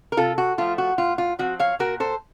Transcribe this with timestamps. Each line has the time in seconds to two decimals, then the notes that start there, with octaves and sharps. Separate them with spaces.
0.12 A#4
0.17 C3 F4 A4
0.38 F#4
0.58 F3 A3 F4
0.78 F#4
0.98 A2 F4
1.18 F4
1.39 F3 C4 F#4
1.59 C#5 F5
1.79 A#2 F#4 A#4
2.00 A4 C5